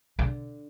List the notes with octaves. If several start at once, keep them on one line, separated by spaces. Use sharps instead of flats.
D3